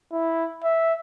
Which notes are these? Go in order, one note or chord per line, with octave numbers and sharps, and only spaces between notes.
E4
E5